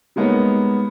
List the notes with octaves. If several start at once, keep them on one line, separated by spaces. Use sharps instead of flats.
G3 G#3 A#3 B3 D#4 C#5